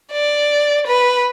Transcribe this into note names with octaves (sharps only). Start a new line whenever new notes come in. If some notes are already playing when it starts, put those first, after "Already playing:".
D5
B4